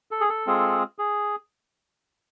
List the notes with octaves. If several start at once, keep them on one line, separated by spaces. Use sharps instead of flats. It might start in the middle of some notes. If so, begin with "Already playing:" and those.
A4
G#4
A4
G#3 C4 F4 G#4
G#4